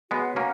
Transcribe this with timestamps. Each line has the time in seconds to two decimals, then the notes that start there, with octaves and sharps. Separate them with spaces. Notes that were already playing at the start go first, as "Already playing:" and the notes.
0.11 G#3 B3 F#4 C#5 F#5
0.36 A#3 C#4